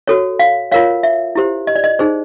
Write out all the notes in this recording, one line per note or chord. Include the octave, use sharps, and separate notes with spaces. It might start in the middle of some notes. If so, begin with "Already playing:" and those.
F#4 A4 C#5
F5
F4 A#4 C#5 F5
E5
E4 G4 C5
D#5
D5
D#5
D#4 G#4 C5